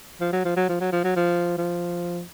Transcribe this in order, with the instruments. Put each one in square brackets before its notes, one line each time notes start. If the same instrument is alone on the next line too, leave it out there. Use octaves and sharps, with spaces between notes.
[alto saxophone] F3
F#3
F3
F#3
F3
F#3
F3
F#3
F3
F3